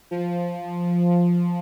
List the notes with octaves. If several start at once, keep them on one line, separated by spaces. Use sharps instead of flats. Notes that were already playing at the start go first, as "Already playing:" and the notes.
F3